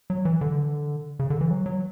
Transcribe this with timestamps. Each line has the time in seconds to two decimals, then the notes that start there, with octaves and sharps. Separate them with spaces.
0.10 F#3
0.25 E3
0.41 D3
1.19 C#3
1.30 D3
1.41 E3
1.51 F#3
1.66 F#3